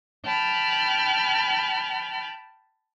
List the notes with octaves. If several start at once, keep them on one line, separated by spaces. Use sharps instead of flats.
G5 A5 B5 F6